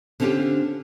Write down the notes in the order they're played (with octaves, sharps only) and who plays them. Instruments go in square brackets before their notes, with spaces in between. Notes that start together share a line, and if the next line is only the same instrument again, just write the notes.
[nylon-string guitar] D3 C4 C#4 D#4 F4 G4